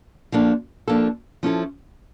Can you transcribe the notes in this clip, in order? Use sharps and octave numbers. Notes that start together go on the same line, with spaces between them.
F3 A#3 D4 A4
F3 A#3 D4 A4
F3 C#4 E4 A4